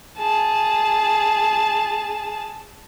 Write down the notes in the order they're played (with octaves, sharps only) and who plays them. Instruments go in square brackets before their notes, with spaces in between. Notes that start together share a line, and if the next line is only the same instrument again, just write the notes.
[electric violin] G#4 A5